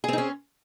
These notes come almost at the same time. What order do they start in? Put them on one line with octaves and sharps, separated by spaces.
G#4 C4 D#4 C#4